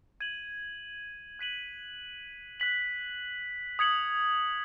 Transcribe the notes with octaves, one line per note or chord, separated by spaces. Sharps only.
G#6 D#7 F#7
F#6 B6 D#7 F#7
F#6 B6 F#7
D#6 G#6 C#7 F#7